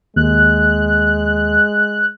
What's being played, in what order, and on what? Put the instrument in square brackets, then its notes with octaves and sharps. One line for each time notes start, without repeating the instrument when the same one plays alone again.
[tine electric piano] D#2 [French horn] G#3 [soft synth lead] F#6